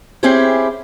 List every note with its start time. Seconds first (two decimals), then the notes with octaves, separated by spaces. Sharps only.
0.23 C4 C#4 E4 G4 G#4 C5